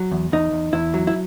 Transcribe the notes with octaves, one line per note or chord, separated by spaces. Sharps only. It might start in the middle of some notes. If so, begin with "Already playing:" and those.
Already playing: F#3
E2
E2 D#4
E2
E2 E4
F#3
E4